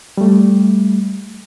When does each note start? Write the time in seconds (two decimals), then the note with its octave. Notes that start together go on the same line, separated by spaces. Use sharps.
0.17 G3 A3